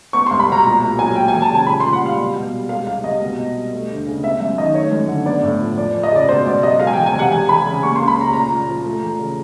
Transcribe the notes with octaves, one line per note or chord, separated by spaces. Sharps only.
B3 C#6
C2 C6
B5
B2 A#5
A#2 A#5
A#2 A#5
F#3 G#5
A#3 G5
G#5
E2
A5
C#3
A5
A#2 B5
A#2 C6
F#5
G3 F5
B2
B2
G3
G#3 F5
C2 F5
C3 D#5
B2
B2
G3
A3
D2
C#3
B3 E5
F#2 E5
D#3 D#5
A3 C#5
F#2
D3
B3 D5
A2
F3
F2 D5
F2
D#5
C#3 D5
B2 C5
B2 D5
F#3 D#5
G#3 F5
G#5
E2 G5
G#5
C3
F#5
E2 G#5
E2 B5
C#3
A#3 C#6
C#2 C6
B5
C#3 A#5
A#2 A#5
A#2
F3
A3
E2
C#3